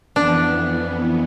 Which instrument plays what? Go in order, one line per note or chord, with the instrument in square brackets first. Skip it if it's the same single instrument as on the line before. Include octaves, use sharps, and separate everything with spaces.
[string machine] F2 E3 B3 [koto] D4